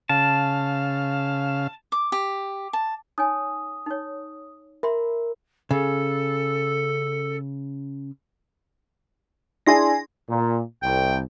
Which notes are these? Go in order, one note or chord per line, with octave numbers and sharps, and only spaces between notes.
C#3 F5 A5
D6
G4
A5
D#4 C#5 G#5 D#6
D#4 C#5
A#4 E5 B5 C6
C#3 A4
D4 E4 G#4 G#5 C6 A#6
A#2
C2 G5